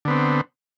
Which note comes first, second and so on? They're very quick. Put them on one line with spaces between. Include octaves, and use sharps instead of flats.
D3 B3 C4